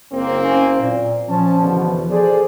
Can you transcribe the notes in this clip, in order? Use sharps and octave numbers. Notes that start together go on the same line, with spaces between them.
F#1 A#3 C4
C#4
A#2
F3 C#4 A5
E2 B2 D3
G#4 A4 C5 D5